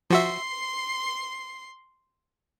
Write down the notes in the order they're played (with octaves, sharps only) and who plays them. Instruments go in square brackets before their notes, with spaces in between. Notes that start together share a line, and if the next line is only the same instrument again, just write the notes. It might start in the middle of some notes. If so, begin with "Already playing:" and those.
[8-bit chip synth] F3 F#4 E5 [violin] C6 C7